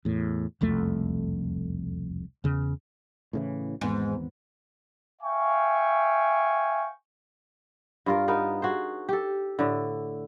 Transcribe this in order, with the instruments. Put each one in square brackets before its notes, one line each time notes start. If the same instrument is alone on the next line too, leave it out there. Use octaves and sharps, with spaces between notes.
[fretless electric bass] E2 A2
E1 C2 F2 A3
E2 C#3
A2 C#3 E3
[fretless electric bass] G#1 E2 B3 [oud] G#2
[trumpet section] E5 F5 G5 G#5 C#6
[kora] G2 F4 A#4
B3 D#4 A#4
F#4 G#4 C5
G4 A4
A2 D3